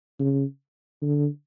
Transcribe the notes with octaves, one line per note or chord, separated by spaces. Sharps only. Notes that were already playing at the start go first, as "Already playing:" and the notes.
C#3
D3